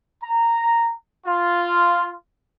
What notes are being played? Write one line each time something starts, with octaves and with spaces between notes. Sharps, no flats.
A#5
F4